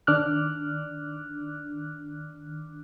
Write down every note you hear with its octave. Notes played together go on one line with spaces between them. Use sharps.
D#3 D4 D6 F6 F#6